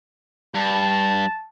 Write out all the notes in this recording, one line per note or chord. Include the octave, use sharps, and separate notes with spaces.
G2 A5